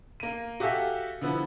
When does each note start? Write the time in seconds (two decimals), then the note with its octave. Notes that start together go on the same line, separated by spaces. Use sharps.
0.20 A#3 D#7
0.60 F#4 G4 A4 E5 F5 G#5
1.21 D3 F3 B3 E4